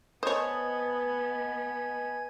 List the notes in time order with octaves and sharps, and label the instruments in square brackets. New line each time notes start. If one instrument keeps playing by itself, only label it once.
[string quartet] B3 [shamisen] C5 C#5 [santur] D#5 A5 [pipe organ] G#5 G#6